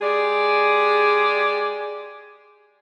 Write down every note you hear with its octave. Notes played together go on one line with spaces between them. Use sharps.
G#3 G4 G#4 D5